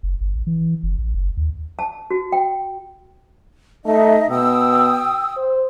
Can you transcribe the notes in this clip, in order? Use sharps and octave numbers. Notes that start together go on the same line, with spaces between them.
F#1
G1
A1
E3
F#1
A1
F#1
D#2
A5
F#4
G5
A3 D#4 D#5 E5
B2 G5 D#6 E6
C5